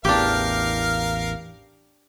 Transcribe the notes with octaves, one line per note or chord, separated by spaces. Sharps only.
A1 E2 D4 G4 A#4 F5